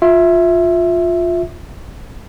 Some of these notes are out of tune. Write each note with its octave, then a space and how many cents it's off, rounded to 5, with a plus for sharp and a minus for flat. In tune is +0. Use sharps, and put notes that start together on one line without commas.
F4 +15 E5 +0